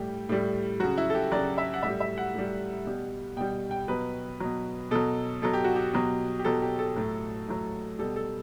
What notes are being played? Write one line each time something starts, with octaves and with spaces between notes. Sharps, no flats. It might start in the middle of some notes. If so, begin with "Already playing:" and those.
Already playing: A2 G3 G4
A2 G3
C#3 F#3 F#4
E4
A4
G4
C#3 F#3 D5
E5
F#5
A2 G3 E5
E5
F#5
A2 G3
B2 G3
B2 G3 G5
G5
B2 F#3 B4
B2 F#3
B2 F#3 A4
B2 F#3 A4
G4
F#4
G4
B2 F#3
G4
B2 F#3 A4
G4
A4
A2 F#3
A2 F#3
B2 G3 A4
A4